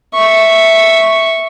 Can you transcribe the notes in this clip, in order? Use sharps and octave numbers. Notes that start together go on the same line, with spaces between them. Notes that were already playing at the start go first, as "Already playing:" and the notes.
E5 C#6